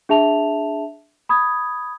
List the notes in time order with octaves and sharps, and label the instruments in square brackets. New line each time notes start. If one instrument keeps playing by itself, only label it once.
[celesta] D4 G#4 E5 A5 F7
B5 D#6 G#6